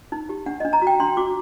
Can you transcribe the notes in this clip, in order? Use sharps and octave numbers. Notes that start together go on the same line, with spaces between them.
D#4
G4
D4 F#5
D#5
D4
A#5
F#4
G5
D4 C6
F#4 D6